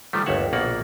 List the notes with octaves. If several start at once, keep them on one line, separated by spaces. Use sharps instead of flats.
D#3 F3 G3 A3
G1 D#2 C#5 E5 F#5
A#1 B2 A#3 D5 F#5